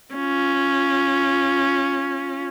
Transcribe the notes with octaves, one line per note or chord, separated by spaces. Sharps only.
C#4 F4